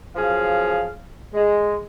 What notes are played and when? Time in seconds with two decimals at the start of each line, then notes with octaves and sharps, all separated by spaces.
0.16 F#2 F3 G#4 F5
1.35 G#3